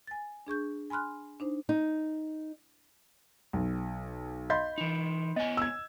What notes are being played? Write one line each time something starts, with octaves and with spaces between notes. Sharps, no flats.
G#5 A6
D4 G#4 C#6 G6
G#5 B5 C6 F6 F#6
D4 D#4 C5
D#4
B1
D#5 F5 B5 C6 G6
E3 D#4
B3 C#5 D#5 G#5
E6 G#6